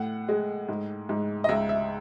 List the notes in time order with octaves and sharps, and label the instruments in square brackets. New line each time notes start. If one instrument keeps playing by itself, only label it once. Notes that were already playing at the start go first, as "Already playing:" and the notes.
Already playing: [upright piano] A2 F#5
G#3
G#2
G#2
D#5
C#2 E5
E5